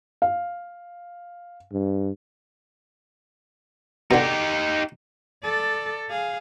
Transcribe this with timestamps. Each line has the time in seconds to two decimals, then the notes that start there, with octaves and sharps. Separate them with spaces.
0.22 F5
1.73 G2
4.11 B2 D3 D#4 G4
5.44 A4 D5
6.10 G#4 F5